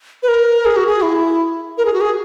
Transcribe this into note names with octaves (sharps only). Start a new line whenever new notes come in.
B4
A#4
G#4
F#4
G#4
E4
A#4
G#4
F#4
G#4